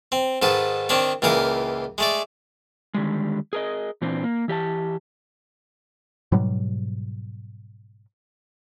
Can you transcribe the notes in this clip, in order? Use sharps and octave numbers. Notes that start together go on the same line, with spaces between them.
C4
G#2 D#3 A4 B4
D#3 C4 D4 C#5
C#2 A#2 E3 A#4 F5
G#3 A3 D5
D3 D#3 G3 G#3
G#4 A#4 D#5
A#2 E3 C4 D4
A#3
E3 G4 D#5 A5
G#2 B2 F#3 G3